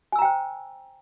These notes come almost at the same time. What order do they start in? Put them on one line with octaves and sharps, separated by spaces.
G#5 E6 A#5 G5 C5